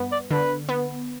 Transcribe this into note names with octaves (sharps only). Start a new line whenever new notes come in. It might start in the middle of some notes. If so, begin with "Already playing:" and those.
Already playing: G2 B3
D5
D3 B4
B3